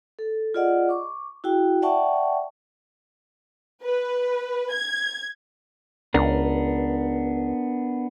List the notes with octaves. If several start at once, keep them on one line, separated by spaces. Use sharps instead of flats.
A4
F4 G#4 D5 D#5 F#5
C#6 D6
E4 F#4 G#4 G5
D5 E5 F#5 G5 A5 C#6
B4
G#6
C#2 B3 D4 A#4